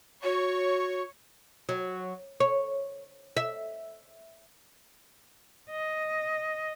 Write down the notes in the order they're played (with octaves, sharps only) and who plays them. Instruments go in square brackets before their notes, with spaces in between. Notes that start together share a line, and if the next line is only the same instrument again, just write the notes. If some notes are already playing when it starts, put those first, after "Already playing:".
[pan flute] F#4 [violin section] C#5
[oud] F#3
C#5
E5
[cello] D#5